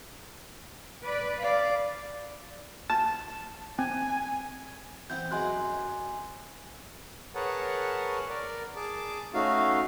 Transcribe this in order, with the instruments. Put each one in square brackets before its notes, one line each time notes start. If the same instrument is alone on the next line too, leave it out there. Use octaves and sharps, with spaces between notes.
[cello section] B4 D5
[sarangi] D5 [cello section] F5
[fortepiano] A5
[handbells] C4 [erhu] G#5
[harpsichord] E3 B3 C4 [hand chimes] G6
[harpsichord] F#3 G#3 B3 [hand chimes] G#5 C6 F#6
[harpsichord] F#2
[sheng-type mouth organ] G#4 A#4 B4 C#5 F#5 A5
A#4 D5
G#4 A5 D6
A3 C#4 D#4 F#4 F5